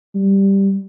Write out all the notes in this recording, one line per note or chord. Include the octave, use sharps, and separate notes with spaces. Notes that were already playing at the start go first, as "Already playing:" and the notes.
G3